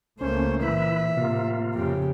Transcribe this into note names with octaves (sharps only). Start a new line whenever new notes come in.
C#2 A3 A#3 C#4 C5
A#2 E3 E4 B4 E5
A2 C3 A#3 F4
F2 C#3 G4